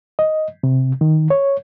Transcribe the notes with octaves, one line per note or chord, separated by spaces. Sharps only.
D#5
C3
D#3
C#5